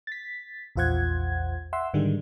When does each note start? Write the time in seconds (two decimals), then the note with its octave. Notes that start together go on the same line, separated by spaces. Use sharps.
0.07 A6 B6
0.76 A#1 E2 F4 C5 F#5 G#6
1.73 E5 F#5 C6 E6
1.94 G#2 D3 D#3 G3 G#3